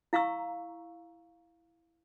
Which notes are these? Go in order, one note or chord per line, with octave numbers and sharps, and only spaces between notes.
E4 F5 A#5 C#6 E6